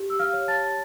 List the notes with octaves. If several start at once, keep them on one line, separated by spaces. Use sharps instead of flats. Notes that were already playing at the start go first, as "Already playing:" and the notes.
Already playing: G4
E6
F5 F6
C#5
A5 A6